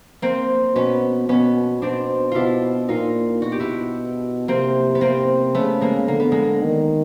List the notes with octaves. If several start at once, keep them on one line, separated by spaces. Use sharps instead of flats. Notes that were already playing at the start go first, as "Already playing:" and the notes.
A#3 C4
B2 B3 C#4
B2 B3 C#4
B2 C4 D4
B2 D4 E4 F4
A#2 D#4 F4
B2 F#4
G4
E4 F#4
C3 A#3 C4
B3
C3 A#3 C4
C#3 A3 B3
G#3 A#3
D3 A#3
B3
G#3 A#3
D#3